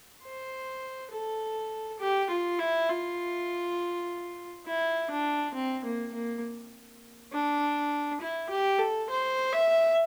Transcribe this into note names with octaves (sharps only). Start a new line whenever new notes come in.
C5
A4
G4
F4
E4
F4
E4
D4
C4
A#3
A#3
D4
E4
G4
A4
C5
E5